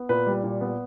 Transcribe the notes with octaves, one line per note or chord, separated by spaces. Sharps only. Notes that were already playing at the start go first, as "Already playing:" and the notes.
Already playing: B3
A#2 B4
G3
A#2
B3